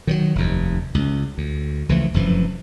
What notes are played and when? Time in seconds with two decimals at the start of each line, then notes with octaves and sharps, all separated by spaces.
0.07 D#3 F3 F#3
0.35 F1 D#2
0.95 C#2
1.38 D2
1.89 C#2 E3 F3 A3
2.14 F1 F#2 E3 F3